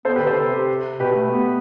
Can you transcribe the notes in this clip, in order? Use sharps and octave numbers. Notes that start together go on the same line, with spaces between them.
B3 A4 C5
G4 B4
D3
A4 C5
C3
B2 G4 B4
A3
B3